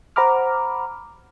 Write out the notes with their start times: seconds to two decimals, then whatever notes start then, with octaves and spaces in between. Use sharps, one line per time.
0.16 C5 F#5 A#5 B5 D6 F6